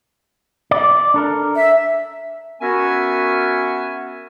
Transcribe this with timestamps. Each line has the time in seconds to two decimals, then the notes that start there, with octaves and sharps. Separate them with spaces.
0.71 D5
1.14 D4 A4 A#4
1.56 E5
2.61 B3 C#4 F#4 A#4 E5 G#5